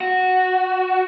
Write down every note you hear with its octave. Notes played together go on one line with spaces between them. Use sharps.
F#4